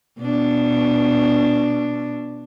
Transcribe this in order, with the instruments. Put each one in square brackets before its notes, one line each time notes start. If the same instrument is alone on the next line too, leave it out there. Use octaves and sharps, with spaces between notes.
[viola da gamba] B2 D4